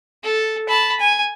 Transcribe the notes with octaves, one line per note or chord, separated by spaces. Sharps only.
A4
A5 B5
G#5